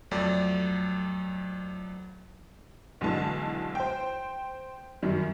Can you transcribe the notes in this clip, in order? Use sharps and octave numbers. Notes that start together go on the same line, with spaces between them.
F2 F#3 A3 D5
B1 D3 E3 G#3 A5
C5 G5
F#2 D#3 G3